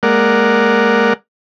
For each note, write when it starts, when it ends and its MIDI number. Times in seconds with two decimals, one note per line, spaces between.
0.03 1.13 56
0.03 1.13 58
0.03 1.13 70
0.03 1.13 74
0.03 1.13 78